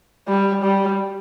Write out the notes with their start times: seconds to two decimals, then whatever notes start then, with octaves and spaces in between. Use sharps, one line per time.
0.28 G3
0.63 G3